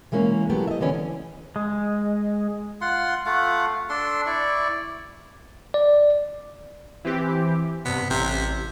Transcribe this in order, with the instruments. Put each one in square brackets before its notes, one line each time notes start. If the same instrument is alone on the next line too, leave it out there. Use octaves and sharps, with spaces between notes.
[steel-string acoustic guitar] E3 G#3 A#3 C#4
F#3 A3 B3 G4
D#5 E5
D3 E3 B3 C#4
[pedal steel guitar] G#3
[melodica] F4 F#5 C6
A3 F4 F5 F#5
D4 A4 C6
E4 D5 C#6
[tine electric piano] D5
[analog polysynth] E3 C4 G4
[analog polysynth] G2 C3 [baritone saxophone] B3
[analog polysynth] A1 [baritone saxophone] C3